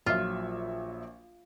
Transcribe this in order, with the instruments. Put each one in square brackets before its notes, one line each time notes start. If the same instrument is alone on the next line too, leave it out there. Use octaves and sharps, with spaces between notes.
[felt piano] A#1 F#3 E5 [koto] F4